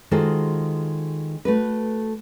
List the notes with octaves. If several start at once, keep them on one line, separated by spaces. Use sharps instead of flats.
D#3 G#3 F4 F#4 A4 C5
A3 F#4 B4